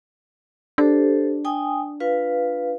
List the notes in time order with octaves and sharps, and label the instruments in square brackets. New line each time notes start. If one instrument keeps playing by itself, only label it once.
[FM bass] D4 [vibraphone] G4 A4 C5
[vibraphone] G5 G#5 D#6
F4 B4 F5